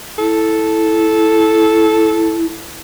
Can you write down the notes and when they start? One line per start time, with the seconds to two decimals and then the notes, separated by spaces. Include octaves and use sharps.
0.18 E4 A4